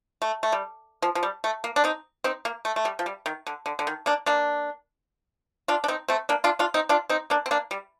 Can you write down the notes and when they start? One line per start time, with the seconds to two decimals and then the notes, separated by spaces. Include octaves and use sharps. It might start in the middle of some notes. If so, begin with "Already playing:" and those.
0.22 A3
0.43 A3
0.52 G3
1.02 F3
1.15 F3
1.23 G3
1.44 A3
1.64 A#3
1.76 D4
1.84 C4 D#4
2.24 C4 D#4
2.45 A#3
2.65 A3
2.76 A3
2.85 G3
2.99 F3
3.06 G3
3.26 D#3
3.47 D3
3.66 D3
3.79 D3
3.87 D#3
4.06 A#3 D4
4.26 A#3 D4
5.68 D4 F4
5.84 D4
5.88 C4 D#4
6.08 A3 C4
6.29 A#3 D4
6.44 D4 F4
6.59 D4 F4
6.74 C4 D#4
6.89 D4 F4
7.10 C4 D#4
7.30 A#3 D4
7.46 C4
7.51 A#3 D4
7.71 G3